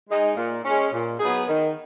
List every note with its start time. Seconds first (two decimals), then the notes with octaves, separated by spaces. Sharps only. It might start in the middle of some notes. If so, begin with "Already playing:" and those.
0.09 G#3 D#4
0.37 A#2
0.65 G#3 C#4
0.93 A#2
1.20 F#3 B3 D#4 G#4
1.48 D#3